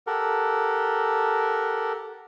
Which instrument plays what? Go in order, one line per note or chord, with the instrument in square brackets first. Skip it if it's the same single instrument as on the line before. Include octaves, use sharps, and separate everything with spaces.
[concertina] G4 A4 A#4 F#5